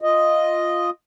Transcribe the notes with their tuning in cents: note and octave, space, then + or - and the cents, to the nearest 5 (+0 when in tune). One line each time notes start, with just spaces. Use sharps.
F4 +0 D#5 +0